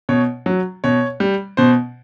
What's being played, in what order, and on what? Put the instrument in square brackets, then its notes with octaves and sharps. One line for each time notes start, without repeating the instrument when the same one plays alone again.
[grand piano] B2 C#5
F#3
B2 C#5
G3
B2 C5